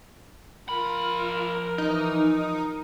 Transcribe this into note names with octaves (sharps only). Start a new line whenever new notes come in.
F3 F4 A#4 B5
E3 D#4